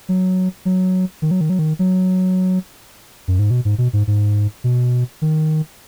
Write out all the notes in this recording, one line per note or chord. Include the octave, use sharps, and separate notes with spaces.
F#3
F#3
D#3
F#3
D#3
F#3
D#3
F#3
F#2
G#2
B2
G#2
B2
G#2
G#2
B2
D#3